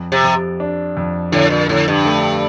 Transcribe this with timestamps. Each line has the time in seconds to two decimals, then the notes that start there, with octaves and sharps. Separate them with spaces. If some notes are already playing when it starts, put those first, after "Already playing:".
Already playing: F2
0.12 C3
0.24 F2
0.60 D4
0.97 F2
1.32 A2 D3
1.50 A#2
1.69 A2 D3
1.88 G2
2.05 A3